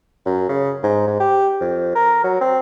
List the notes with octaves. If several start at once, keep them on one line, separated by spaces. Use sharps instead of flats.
F#2
C#3
G#2
G#2
G4
F2
A#4
F#3
C4